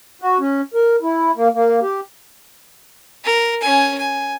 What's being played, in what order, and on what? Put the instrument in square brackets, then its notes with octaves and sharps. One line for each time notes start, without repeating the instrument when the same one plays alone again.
[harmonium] F#4
C#4
A#4
E4
A#3
A#3
G4
[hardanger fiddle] A#4
C#4 G#5
G#5